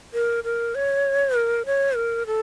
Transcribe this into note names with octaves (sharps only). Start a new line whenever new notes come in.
A#4
A#4
C#5
A#4
C#5
A#4
A4